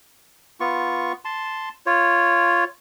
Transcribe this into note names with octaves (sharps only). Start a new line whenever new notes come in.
B3 F4 C#6
A5 C6
F4 C#5